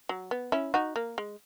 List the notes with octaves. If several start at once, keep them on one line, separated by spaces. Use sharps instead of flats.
F#3
B3
C#4 E4
D#4 F#4
A#3
G#3